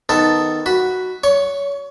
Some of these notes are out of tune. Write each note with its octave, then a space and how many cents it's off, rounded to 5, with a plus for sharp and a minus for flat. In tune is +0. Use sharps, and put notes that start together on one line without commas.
D#3 +0 B3 +15 A4 +0
F#4 +0 B5 +0
C#5 +30 C#6 +0